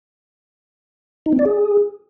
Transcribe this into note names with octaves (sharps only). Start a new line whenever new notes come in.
D#4
C4
D5
G#4